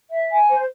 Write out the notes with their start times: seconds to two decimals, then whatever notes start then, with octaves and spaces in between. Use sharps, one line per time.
0.09 E5
0.30 G#5
0.49 C5